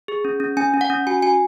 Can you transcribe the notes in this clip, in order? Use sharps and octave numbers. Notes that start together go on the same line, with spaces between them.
G#4
C#4
C#4
C#4 G#5
C#4
F#5
C#4
F#4 G#5
F#4 G#5